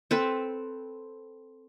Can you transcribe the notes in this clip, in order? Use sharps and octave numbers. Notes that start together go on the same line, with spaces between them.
C4 A4 B4